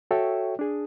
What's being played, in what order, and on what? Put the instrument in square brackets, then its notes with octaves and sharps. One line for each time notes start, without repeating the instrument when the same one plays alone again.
[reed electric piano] F#4 A4 C#5 E5 G5
D4 G#4